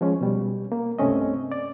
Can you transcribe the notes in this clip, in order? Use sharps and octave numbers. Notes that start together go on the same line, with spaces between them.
F3 G#3 C#4
B2 G3
A#3
C2 G2 A3 C4 C#4 D#5
D5